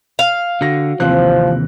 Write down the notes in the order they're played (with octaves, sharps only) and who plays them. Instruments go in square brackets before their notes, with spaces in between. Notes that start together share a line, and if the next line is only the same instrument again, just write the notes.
[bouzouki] F5
[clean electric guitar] D3 [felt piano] F#4 A#6
[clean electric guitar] D#2 C3 E3 [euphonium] F3 [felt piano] C4 C5 F#6